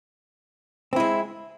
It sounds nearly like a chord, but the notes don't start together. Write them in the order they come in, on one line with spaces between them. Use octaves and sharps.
C4 E4 G#3